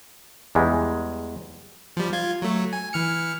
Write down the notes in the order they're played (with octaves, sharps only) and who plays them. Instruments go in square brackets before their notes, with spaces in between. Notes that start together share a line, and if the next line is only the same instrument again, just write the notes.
[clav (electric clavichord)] E2 G3 G#3
[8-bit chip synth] F3 G3
F4 G#6
F#3 A3
G#5
E3 F6 C#7